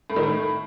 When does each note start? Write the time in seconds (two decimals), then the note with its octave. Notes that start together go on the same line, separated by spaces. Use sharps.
0.10 A2
0.16 D#3
0.23 A2